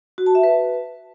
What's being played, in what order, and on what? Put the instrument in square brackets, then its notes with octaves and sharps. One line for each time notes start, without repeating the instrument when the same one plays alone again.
[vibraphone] F#4
A5
E5
B4